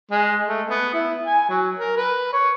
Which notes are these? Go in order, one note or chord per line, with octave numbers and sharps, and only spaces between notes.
G#3
A3
B3
E4
G#5
F#3
A#4
B4
C#5